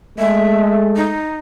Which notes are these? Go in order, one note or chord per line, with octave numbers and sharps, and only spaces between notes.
G#3 A3 E5
D#4